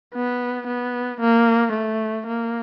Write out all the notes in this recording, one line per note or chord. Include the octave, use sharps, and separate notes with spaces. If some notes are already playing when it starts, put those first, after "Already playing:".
B3
B3
A#3
A3
A#3